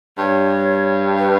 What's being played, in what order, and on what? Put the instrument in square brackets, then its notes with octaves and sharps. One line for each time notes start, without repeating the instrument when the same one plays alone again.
[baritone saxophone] G2 [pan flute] C#5
[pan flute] B4